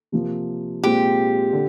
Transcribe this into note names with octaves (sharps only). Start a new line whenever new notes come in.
C3 F3 A#3
A#2 G#3 C4 F4 G4
D3